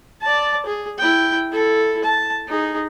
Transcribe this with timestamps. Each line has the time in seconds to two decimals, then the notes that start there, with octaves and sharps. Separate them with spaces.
0.21 D5 A5
0.66 G#4
0.98 E4 G5
1.52 E4 A4
2.04 A5
2.48 D#4 G#4